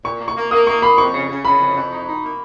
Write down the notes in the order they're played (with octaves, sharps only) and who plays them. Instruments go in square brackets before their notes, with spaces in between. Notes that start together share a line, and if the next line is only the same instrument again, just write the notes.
[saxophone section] A#2 [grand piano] C#6
[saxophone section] A#3
[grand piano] C#6
[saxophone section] A#3
[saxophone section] A#3 [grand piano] D#6
[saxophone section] A#3 [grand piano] C#6
[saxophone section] A#3 [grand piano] B5
[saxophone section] F2 [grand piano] C#6
[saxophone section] C#3
C#3
[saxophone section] C#3 [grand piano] B5
[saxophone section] F2
F2
D#4
D#4
A#3